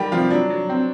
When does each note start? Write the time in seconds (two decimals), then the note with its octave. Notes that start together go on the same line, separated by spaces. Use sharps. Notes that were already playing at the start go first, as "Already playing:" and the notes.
Already playing: D#3 G3 G4
0.12 C3 F3 F4
0.30 F#3 D4
0.50 F#3
0.69 C4